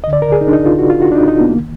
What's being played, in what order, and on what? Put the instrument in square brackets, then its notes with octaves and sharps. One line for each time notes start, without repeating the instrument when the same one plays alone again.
[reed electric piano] D2 D3 D#5
D5
A#4
G#4
D#4
D4
D#4
F4
F#4
F4
F#4
D4
D#4
D#4
B3
A#3
D#3